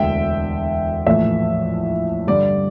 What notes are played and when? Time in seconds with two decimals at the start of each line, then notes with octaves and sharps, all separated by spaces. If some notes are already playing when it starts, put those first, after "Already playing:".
Already playing: E1 D2 D3 A3 E5 G5
1.06 A#1 A2 E3 A3 E5
2.27 G2 D3 G3 D5